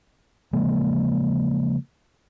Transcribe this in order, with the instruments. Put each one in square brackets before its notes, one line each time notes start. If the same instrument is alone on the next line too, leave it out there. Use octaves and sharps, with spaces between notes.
[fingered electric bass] C#3 F3 G#3 A#3